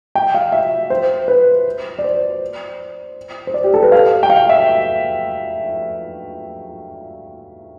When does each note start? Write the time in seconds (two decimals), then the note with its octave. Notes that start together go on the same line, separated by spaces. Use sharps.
0.15 G5
0.34 F5
0.52 E5
0.90 C5
1.28 B4
1.99 D5
2.04 C5
3.47 C5
3.54 D5
3.64 G4
3.74 A4
3.83 B4
3.92 F5
4.23 G5
4.30 F5
4.49 E5